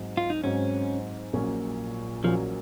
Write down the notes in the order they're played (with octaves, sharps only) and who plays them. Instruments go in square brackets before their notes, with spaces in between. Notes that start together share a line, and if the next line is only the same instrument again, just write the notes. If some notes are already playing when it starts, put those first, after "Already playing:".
Already playing: [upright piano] G#2 F#3 C4
[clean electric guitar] F4
D#4
[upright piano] G#2 F#3 C4 [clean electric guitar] C#4
[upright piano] A#1 A#2 F#3 A#3 C#4
[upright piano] A#1 A#2 F#3 A#3 C#4 [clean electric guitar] F3